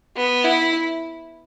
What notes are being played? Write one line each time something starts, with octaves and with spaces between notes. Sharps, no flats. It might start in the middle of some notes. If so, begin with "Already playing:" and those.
B3
E4